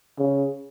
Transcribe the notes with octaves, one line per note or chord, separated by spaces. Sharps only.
C#3